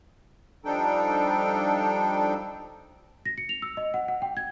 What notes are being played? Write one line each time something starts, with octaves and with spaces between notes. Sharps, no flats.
F3 G3 D4 D#4 A4 G5
A#6
C#7
F7
E6
D#5
F#5
F#5
G5
G#6